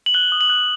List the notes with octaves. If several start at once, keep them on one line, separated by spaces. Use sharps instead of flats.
F#7
F#6 G7
D#6
F#7
F#6